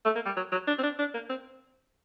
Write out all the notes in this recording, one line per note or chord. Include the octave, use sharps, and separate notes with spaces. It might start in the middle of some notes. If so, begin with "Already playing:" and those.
A3
A#3
G3
F#3
F#3
D4
C4
D4
D4
A#3
C4